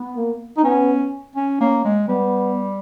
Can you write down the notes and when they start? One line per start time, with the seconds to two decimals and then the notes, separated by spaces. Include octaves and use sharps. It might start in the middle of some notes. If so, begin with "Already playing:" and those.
Already playing: B3
0.17 A#3
0.57 D#4
0.63 B3 C#4
1.36 C#4
1.60 A#3 C#4
1.85 G#3
2.08 G3 B3